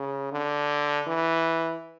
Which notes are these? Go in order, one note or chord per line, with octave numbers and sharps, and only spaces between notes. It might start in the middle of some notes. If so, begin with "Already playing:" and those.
Already playing: C#3
D3
E3